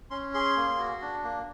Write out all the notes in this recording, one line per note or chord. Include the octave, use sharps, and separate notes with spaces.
C#4 C6
G#4 C6
A#3
F#4
D4
A#3